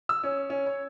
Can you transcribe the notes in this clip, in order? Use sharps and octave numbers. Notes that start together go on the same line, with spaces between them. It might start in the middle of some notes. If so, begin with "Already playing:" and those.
E6
C#4
C#4
C#5